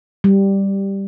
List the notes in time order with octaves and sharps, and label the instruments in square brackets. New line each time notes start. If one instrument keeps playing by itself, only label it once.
[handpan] G3